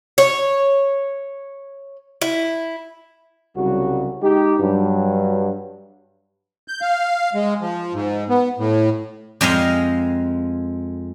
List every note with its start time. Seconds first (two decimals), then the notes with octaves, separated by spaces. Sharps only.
0.18 C#5
2.21 E4
3.56 C2 C#3 F#3 G3 F#4
4.22 G#3 D#4 G4
4.59 G2 F#3
6.68 G6
6.81 F5
7.35 G#3
7.61 F3
7.94 G#2
8.29 B3
8.58 A2
9.41 F2 G#3 D#5 F5